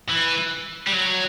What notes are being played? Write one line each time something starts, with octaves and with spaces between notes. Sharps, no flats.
E3
G3
F#3